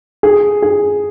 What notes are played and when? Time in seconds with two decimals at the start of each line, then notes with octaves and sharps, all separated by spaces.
0.23 G#4
0.62 G#4